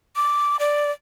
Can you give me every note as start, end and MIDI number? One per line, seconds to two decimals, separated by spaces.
0.16 0.56 86
0.60 0.91 74